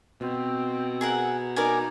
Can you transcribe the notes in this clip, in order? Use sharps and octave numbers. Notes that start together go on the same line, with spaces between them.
B2 C4
G#4 A#4 F#5
D#4 A#4 D5 G#5